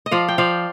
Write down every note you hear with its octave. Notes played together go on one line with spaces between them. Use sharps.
D#5
F3 D5 F5
G5
F3 D5 F5